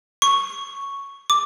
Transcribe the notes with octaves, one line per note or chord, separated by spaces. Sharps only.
C#6
D6